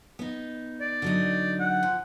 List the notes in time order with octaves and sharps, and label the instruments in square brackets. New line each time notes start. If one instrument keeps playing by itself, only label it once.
[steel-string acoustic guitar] B3 D#4
[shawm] D5
[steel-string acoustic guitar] D3 F#3 D#4
[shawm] F#5
[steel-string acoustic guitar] F3